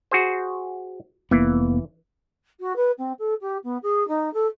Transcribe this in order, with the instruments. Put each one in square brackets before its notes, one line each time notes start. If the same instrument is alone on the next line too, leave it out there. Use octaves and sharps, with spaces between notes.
[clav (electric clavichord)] F#4 G#4 C5
[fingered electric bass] F1 A#3 B3 [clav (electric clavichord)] E3
[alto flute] F#4
B4
C4
A4
G4
B3
G#4
D#4
A4